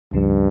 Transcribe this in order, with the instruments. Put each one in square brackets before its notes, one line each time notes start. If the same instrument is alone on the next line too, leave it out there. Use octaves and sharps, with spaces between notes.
[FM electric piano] C#2 C#3 F3 [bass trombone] G2